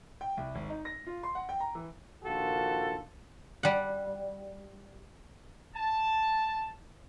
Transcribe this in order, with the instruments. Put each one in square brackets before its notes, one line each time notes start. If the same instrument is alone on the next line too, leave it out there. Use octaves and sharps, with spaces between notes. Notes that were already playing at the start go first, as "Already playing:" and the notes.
[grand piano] G5
C2
G#1
D#4
A#6
F4
C6
F#5
G5
A#5
E3
[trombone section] A#1 D#3 F4 F#4 A4
[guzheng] G3 F#5
[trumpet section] A5